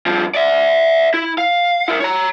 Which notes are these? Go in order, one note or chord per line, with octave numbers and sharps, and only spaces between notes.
G2 F3
D5 E5
E4
F5
E4 A#4
C#5 A#5